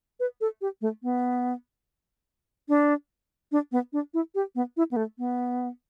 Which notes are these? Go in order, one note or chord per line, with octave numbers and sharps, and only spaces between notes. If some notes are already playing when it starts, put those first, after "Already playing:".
B4
A4
G4
A3
B3
D4
D4
B3
D4
E4
G4
B3
E4
B3
A3
B3